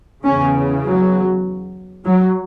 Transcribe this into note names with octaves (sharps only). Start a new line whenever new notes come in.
E2 C#3 C#4
F#3
F#3